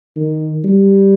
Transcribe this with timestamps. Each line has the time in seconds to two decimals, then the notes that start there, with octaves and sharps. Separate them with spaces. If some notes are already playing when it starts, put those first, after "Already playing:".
0.16 D#3
0.64 G3